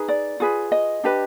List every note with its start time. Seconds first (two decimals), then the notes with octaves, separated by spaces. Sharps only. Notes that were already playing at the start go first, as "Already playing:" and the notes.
Already playing: D#4 G#4 B4
0.08 D5
0.40 F4 G#4 B4
0.72 D#5
1.04 D4 G4 B4